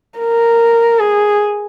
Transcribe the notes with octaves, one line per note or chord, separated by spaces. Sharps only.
A#4
G#4